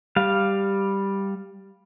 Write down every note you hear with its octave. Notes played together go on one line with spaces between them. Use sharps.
G3 F5